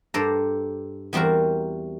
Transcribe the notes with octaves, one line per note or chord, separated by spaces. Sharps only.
G2 A4 C5 D5 A#5
E2 G3 C4 F#4 A#4